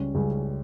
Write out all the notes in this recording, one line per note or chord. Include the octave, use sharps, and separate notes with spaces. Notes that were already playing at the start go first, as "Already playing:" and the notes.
Already playing: C#2 C#3 G3 C#4
C#2 C#3 G3 C#4